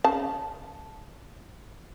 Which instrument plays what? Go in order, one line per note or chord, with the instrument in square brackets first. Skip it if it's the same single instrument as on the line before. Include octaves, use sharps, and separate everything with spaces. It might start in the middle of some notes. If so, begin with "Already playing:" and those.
[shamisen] C#3 A5